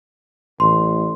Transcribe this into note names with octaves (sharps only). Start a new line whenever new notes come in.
A1 C6